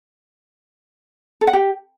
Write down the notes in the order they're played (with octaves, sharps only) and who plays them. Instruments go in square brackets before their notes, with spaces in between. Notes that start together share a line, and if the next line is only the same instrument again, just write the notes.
[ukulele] A4
F#5
G4